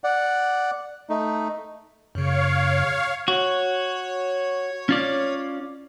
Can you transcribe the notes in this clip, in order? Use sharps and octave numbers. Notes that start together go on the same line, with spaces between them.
D5 F#5
A3 D#4
F#2 C#3 C#5 F5
F#4 C#5
C#4 F4 D5